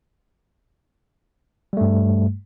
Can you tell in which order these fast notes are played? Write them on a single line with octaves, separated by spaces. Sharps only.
G3 A3 G2